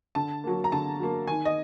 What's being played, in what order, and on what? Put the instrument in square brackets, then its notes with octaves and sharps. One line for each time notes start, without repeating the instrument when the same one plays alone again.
[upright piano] D3 A5
F#3 A#3
A#5
D3 A5
F#3 A#3
D#3 G#5
D#5